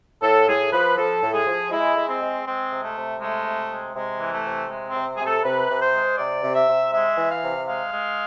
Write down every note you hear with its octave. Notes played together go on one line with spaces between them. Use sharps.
A2 A4
A2 G#4
F3 B4
F3 A4
A2
G#4
F3
G#3 E4
G#3
C4
G#3
G#3 C4
C3
A3
C3
G#3 A3
C3
G#3
C3 G#3
E3
A3
C3
G#3
C4
C3
C3 G#4
A4
C3 B4
C3
C5
G#3
C3 D5
C3
E5
C3
G#3 E5
E3
F5
C3
G#3 F5
G#3